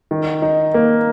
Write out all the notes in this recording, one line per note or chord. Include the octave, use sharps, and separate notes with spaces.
D#3
D#4
A#3